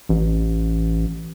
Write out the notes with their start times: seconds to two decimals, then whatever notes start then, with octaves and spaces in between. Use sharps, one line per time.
0.09 A1